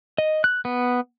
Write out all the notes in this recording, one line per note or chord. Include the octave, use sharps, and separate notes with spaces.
D#5
F#6
B3